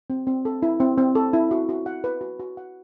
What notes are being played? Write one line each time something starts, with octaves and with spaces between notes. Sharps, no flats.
C4
C4
A4
E4
C4
C4
A4
E4
F#4
F#4
F#5
B4
F#4
F#4
F#5